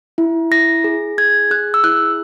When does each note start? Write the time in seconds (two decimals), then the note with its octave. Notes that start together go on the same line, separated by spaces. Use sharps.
0.18 E4
0.51 E4 A#6
0.84 G#4
1.18 G#4 G#6
1.51 G#4 F#6
1.74 E6
1.84 E4 F#6